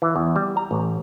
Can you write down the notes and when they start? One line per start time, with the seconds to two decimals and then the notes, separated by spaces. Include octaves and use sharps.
0.02 E3
0.16 E2
0.36 G3
0.57 A#5
0.71 A1